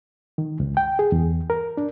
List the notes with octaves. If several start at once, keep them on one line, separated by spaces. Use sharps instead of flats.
D#3
C#2
G5
G#4
E2
A#4
D4